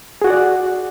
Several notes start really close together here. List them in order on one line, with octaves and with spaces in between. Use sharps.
G#4 F#4 F#5 D5